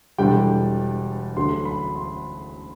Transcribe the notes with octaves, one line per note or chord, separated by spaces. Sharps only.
E1 E2 D3 G3 G5
D2 D3 F#3 C6
B5
C6